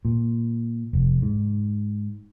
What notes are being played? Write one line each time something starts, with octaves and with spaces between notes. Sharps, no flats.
A#2
F1
G#2